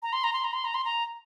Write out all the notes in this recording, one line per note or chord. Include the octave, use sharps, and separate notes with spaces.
A#5
C6
A#5
C6
A#5
C6
A#5
C6
A#5